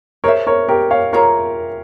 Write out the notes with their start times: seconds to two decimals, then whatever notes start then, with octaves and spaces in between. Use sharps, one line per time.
0.24 G#4 A#4 C5 C#5 E5
0.47 A#4 C#5
0.68 G4 A#4
0.91 C#5 F5
1.13 F4 G#4 A#4 C#5 E5 A#5